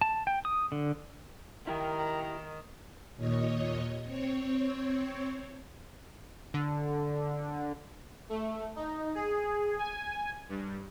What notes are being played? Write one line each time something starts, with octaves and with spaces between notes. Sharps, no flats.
A5
G5
D#6
D3
D#3 E4 G4 A#4
D#2 A#2 C#5 D#5
C4 C#5
D3
A3
D#4
G#4
G#5
G2